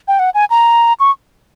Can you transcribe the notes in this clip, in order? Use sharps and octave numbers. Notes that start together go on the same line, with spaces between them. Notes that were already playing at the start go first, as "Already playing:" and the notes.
G5
F#5
G#5
A#5
C#6